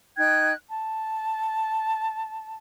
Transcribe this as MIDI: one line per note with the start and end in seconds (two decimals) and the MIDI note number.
0.17 0.52 63
0.17 0.52 79
0.17 0.52 90
0.17 0.52 92
0.70 2.56 81